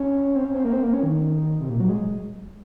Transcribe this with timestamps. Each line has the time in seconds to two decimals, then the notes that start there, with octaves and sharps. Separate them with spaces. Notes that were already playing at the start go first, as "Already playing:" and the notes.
Already playing: C#4
0.36 C4
0.45 C#4
0.54 C4
0.64 A#3
0.73 C4
0.83 A#3
0.94 C#4
1.03 D#3
1.60 C3
1.69 A#2
1.80 F#3
1.89 G#3